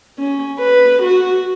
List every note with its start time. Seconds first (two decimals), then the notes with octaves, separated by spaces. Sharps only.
0.19 C#4
0.59 B4
1.02 F#4